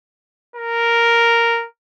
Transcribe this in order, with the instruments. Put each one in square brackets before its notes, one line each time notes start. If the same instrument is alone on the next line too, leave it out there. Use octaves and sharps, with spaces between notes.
[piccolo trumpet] A#4